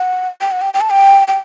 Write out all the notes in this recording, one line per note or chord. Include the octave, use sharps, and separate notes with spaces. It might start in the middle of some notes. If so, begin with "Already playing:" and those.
Already playing: F#5
G5
F#5
G5
G5
A5
G5
G5